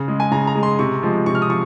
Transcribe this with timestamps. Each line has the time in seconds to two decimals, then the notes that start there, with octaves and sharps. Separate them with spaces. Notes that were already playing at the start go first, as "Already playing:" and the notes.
Already playing: C#3
0.08 G#3
0.20 G#5
0.31 C#3 A#5
0.47 A#5
0.55 G#3
0.63 C6
0.79 C3 C#6
1.03 F3 G#3
1.26 C3 C#6
1.35 F6
1.42 D#6
1.49 F3 C#6